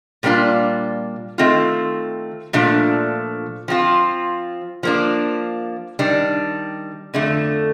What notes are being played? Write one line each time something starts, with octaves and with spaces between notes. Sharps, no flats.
A#2 G3 A#3 D4 F4
D#3 A3 C4 F4
A#2 F3 A3 D4
F3 C4 F4
F3 A#3 D4
D#3 G3 D4
F2 D3 A3